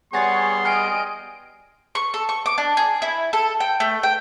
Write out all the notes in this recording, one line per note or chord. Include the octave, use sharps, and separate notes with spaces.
G3 B3 G#4 C#5 F#5 G#5 C6 A6
D#5 G5 G#5 F6 D7
C#6
A4
C#6
D6
D4
G#4
E4
A4
G5
A3
G5